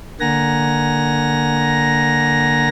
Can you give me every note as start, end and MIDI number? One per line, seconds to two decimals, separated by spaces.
0.20 2.69 50
0.20 2.69 58
0.20 2.69 78
0.20 2.69 80
0.20 2.69 82
0.20 2.69 94